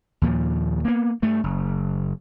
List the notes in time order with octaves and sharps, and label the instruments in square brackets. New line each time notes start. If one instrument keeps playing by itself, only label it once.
[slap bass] D#2 A#2 F3
A#3 B3
G2 A3
F#1